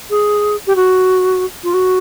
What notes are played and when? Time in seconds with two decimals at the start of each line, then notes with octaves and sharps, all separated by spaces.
0.10 G#4
0.67 G4
0.75 F#4
1.63 F4
1.73 F#4